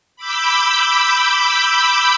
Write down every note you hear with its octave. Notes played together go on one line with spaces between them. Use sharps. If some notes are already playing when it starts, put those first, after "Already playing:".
B5 D6 E6 G6